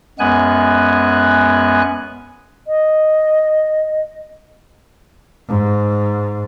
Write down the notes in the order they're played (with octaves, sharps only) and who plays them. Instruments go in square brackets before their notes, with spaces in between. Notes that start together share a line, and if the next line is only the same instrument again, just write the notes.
[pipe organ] F#2 G#3 B3 G#5 F#6
[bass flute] D#5
[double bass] G#2